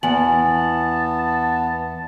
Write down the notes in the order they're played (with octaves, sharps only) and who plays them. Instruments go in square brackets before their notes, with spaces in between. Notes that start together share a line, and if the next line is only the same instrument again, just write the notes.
[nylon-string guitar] E2 [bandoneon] B3 [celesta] G#5 F#7 [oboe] A5